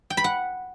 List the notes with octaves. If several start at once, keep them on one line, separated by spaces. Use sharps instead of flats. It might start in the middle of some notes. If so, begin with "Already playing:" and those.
G5
B5
F#5